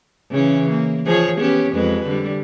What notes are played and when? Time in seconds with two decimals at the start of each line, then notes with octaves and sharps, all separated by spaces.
0.31 C#3 E3 C#4
0.70 A#3
1.06 F3 G#4 C#5
1.41 B3 C#4 G4
1.73 F2 G#3 B4
2.07 D3 G3